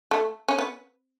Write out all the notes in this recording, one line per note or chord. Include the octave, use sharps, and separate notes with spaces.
A3
C#4
B3